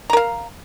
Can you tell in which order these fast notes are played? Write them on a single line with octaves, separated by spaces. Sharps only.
A#5 A#4 F5